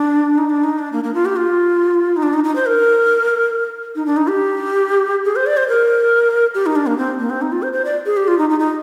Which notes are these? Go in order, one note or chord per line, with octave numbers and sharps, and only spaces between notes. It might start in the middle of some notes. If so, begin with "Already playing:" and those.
Already playing: D4
D#4
D4
D#4
D4
A#3
A#3
F4
G4
F4
D#4
D4
D#4
D#4
C5
A#4
D#4
D4
D#4
G4
G#4
C5
D5
C5
A#4
G4
D#4
D4
A#3
C4
A#3
C4
D#4
F4
C5
C5
D5
G#4
G4
F4
D#4
D#4
D#4